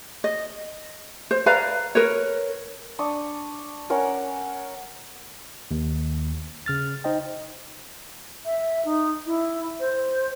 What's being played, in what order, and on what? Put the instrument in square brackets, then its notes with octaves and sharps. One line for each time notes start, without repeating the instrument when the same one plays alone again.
[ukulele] D#5
C5
B4 D5 F5 A#5
A#4 B4 C#5
[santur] D4 C#6 D#6
C#4 A#4 C#5 F#5
[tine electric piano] D#2
C#3 F6 A6
D#4 C5 D#5 G5
[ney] E5
D#4
E4
C5